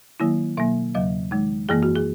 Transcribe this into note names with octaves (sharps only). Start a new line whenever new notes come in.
D#3 F#3 A#3 E4
B2 F#3 A#3 E5
E2 C#3 F#3 D#5
D#3 G#3 D#4
F#2 E3 A#3 G#4
F#4
G#4